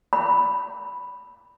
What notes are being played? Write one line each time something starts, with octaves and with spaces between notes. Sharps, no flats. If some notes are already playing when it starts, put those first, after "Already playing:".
B5